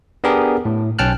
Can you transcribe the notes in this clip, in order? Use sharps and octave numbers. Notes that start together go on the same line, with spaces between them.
B3 D4 G4 G#4 A#4
A2
B1 C#4 G5 A5 F6 F#6